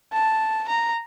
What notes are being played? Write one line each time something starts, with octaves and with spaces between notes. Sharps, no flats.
A5
A#5